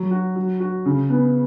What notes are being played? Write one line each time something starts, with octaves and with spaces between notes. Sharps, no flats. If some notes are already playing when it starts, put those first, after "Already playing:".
Already playing: F#3
F#4
F#3
F#4
C#3
B3